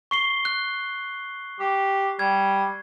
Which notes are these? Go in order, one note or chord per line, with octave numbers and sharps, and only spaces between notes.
C#6 C7 G7
F#6
G4
G3 G#6